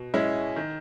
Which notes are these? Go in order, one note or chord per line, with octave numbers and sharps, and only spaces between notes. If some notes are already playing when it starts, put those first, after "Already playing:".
Already playing: B2
G#3 C#4 E4
D#3